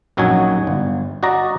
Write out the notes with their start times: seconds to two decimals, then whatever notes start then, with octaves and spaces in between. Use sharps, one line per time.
0.17 A#1 F#2 F#3 D#4 F#4 G#5
0.67 G1
1.23 F#4 D5 D#5 A#5